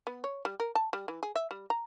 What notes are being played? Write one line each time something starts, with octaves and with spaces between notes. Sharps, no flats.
B3
C#5
G3
A#4
A5
G3
E3
G#4
E5
G3
A#5